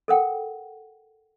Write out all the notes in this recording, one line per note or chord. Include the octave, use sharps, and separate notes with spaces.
A4 A#4 F#5 G5